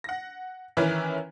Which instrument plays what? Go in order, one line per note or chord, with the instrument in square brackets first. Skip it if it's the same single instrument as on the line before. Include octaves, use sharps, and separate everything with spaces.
[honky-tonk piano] F#5 A#6
D#3 E3 C#4 E4 B4